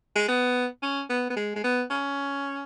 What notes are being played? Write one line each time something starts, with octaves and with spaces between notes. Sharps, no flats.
G#3
B3
C#4
B3
B3
G#3
G#3
B3
C#4